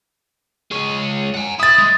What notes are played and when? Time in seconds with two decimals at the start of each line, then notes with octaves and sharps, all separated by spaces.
0.71 G#3 C#5
1.35 F#5 G#5
1.60 E4 D#6 A6
1.79 G#3